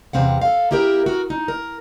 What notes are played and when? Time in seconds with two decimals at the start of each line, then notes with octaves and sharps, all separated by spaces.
0.13 E2 C3 C4 F5 F#5
0.42 A4 F5
0.71 A#3 E4 G4 G#4 A#4
1.06 F#4 A#4
1.30 D#4
1.48 A#4